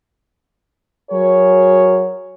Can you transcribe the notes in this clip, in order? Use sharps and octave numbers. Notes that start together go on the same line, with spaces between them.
F#3 F#4 G#4 A#4 C#5